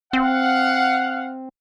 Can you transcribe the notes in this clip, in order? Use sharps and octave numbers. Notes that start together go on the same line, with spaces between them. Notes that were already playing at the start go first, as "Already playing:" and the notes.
C4 F5 F#5